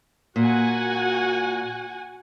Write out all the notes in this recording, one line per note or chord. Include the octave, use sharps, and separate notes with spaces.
A#2 F#4 F#5 G#5